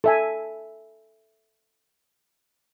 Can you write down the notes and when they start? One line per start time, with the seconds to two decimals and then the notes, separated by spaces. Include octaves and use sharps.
0.04 A4 E5 G#5